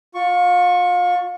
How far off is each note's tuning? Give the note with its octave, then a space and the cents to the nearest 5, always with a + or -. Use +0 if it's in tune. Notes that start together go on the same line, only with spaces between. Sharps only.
F4 +35 C#6 +0